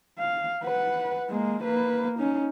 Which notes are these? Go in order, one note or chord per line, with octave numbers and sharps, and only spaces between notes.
F5
B4 F#5
G#3 A#3
A#3 B4
C#4 D#4